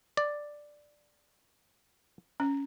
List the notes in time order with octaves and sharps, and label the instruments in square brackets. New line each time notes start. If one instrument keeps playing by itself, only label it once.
[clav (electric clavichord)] D5
[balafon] C#4